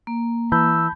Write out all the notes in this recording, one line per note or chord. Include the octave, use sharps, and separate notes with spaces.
A#3
E3 A5 B5 E6 G6